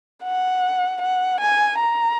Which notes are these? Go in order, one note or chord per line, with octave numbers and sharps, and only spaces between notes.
F#5
F#5
G#5
A#5